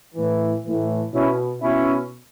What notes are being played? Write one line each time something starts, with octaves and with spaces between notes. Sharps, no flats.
A2 E3
A2 E3
B2 C#4 E4
B2 C#4 E4